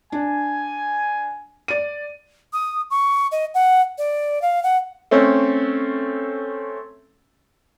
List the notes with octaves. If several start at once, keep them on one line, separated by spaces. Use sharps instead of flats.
D4 G#5
D5 D#7
D#6
C#6
D#5
F#5
D5
F5
F#5
A3 C4 C#4